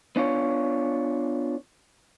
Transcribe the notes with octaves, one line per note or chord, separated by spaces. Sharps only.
B3 D4 F4 C#5